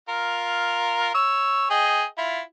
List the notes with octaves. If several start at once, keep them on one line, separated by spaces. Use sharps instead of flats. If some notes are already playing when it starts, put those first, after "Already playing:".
F4 A#4
C#5 E6
G#4 D#5 G5
E4 F4